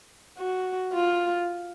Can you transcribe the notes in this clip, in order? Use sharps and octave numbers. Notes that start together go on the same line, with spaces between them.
F#4
F4